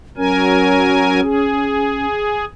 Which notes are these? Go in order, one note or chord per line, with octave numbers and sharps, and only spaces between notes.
F#3 C#4 A#4 G#5
G#4